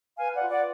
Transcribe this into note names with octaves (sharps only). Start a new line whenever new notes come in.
B4 F5 G#5
D5 F#5
F4
D5 F#5